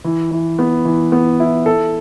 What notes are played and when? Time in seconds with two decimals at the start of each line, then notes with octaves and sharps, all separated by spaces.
0.04 E3
0.31 E3
0.59 B3
0.85 E3
1.12 B3
1.40 E4
1.66 A4